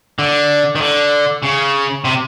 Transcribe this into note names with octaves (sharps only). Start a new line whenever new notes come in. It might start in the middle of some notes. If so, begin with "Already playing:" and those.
D3
D#3
D3
C#3
C3